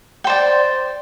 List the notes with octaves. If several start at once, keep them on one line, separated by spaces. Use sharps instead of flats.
C5 D5 G5